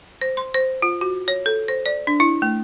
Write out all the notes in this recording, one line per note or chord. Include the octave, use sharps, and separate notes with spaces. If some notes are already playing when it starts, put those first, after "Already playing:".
C5
C6
C5
F4
F#4
C#5
A4
C5
D5
D4
E4
A3